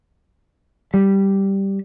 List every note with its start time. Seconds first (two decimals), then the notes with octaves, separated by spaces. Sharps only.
0.94 G3